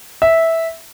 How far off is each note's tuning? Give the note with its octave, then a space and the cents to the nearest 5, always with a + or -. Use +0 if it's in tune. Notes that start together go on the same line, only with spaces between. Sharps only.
E5 -10